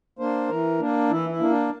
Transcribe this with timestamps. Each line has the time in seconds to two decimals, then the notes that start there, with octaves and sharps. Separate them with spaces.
0.19 A#3 D4 C5
0.49 E3 A#4
0.79 A#3 D4
1.10 E3 E4
1.29 E4
1.39 A#3 D4
1.49 D4